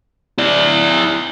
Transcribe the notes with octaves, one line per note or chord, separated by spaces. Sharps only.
E4 D5